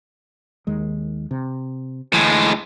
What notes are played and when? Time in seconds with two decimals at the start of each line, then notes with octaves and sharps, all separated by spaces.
0.67 D#2 D#3 G#3
1.31 C3
2.13 D2 A2 E3 G#3